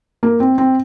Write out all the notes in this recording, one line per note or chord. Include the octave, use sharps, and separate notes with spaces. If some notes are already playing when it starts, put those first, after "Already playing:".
A#3
C4
C4